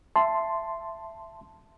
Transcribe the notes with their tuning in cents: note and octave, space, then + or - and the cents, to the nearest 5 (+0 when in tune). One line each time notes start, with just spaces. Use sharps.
E5 +20 A5 +0 C6 +0